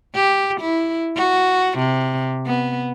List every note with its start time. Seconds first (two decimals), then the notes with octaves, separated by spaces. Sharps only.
0.15 G4
0.61 E4
1.16 F#4
1.78 C3
2.46 B3